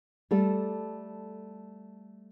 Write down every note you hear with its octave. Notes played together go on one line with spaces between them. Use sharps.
G3 A3 A4